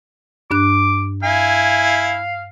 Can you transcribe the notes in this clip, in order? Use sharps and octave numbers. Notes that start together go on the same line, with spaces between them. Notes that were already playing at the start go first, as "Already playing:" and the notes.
G2 D4 D6 F#6
E4 F5 G#5